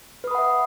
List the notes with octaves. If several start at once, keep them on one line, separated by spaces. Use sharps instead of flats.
B4 E5 F#5 B5 D#6